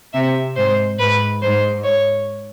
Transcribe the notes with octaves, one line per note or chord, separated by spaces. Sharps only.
C3 E5
G#2 C5
G#2 B4
G#2 C5
C#5